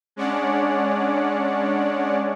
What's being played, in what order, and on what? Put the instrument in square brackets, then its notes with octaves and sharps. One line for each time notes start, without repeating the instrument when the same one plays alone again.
[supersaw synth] G#3 C#4 D4 C#5 D5 F#5